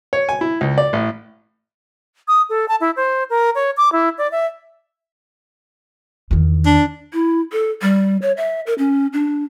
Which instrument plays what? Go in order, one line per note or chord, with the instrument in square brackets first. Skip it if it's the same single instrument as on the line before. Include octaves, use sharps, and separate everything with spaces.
[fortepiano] C#5
G#5
E4
C#2
D5
A1
[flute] D#6
A4
A5
E4
C5
A#4
C#5
D6
E4
D5
E5
[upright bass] E2 D#3
[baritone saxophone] D4
[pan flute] E4
A4
G3
C#5
E5
A#4
C#4
D4